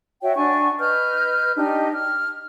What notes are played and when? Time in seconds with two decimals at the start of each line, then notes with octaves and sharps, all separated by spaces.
0.22 F#4 C#5 E5 G5
0.37 D4 F#5 G#5 C#6
0.79 B4 D#5 F6 G6
1.57 D4 D#4 G4 D#5
1.93 F6